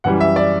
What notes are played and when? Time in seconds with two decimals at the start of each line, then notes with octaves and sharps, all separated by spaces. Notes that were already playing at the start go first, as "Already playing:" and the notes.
0.04 F#2 E3 G3 F#5
0.21 E5
0.36 D5